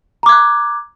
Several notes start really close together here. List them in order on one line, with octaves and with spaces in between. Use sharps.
A#5 D6 G#6 F#6